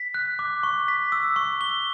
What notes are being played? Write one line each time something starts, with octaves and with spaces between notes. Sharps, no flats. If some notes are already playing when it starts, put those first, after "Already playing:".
Already playing: B6
F#6
D6
C#6
B6
E6
C#6
G7